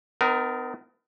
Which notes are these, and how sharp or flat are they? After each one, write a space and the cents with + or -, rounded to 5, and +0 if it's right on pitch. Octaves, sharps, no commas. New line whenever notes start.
B3 +35 D#4 -35 A#4 +0